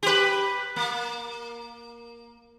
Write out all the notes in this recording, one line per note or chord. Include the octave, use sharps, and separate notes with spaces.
G4 B4
A#3